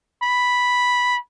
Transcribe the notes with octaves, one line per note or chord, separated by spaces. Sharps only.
B5